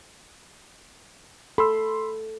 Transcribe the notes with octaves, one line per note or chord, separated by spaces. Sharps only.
A4 B5 C6 E6